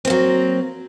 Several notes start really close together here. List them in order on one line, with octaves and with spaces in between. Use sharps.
C4 A#3 F#3